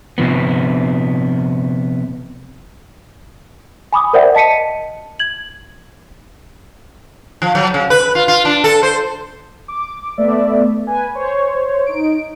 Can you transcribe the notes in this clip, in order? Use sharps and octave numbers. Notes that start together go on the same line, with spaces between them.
C3 F3 B3
G#5 B5 D6 D#6
A#4 C5 D5 E5 F#5 G5
D#5 A5 B6 C#7 D#7
G#6 F#7
F3
F#3
C#3
B4
F4
F4
D4
A4
C5
D6
A3 B3 D5 E5
B4 G#5
C5 C#5
D#4 D7